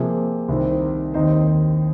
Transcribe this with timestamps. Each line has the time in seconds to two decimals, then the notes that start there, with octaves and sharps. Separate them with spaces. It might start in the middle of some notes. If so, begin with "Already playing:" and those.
Already playing: C3 F3 A#3 G#4
0.49 C2 C3 D#3 C4
1.14 D#2 D#3 C4 D#4 C5